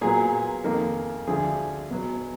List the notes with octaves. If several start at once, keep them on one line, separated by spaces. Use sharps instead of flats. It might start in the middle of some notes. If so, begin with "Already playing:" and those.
A#2 F#3 B3 G#4
F2 D#3 A#3
D2 D3 F3 G#4
B2 F#3 B3